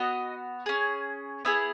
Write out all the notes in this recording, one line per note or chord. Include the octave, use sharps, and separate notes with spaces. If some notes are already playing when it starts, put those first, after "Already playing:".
Already playing: B3 F#4 D#5
C#4 G#4
B3 E4 G#4 E5